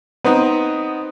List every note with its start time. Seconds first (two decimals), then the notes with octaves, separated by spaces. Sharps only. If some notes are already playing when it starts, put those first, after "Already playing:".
0.24 B3 C4 D#4